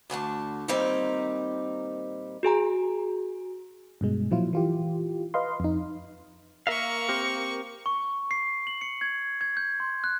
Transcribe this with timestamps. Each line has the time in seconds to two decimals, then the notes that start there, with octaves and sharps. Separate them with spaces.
0.10 D2 D3 A3 A5
0.68 A#2 D#3 G3 A#3 C4 D#4
2.43 F#4 G#4 G#5 A#5
4.01 G2 B2 G#3
4.31 A#2 F3 F#3 E4 F4
4.53 E3 F4 G4
5.34 B4 D#5 F5 C6
5.60 F2 D#4
6.67 A#3 A#4 E5 F5 C#6
7.09 C4 G4 A#4
7.86 C#6
8.31 C7
8.67 F#7
8.81 C#7
9.01 G#6
9.41 G#6
9.57 G6
9.80 C6
10.04 F#6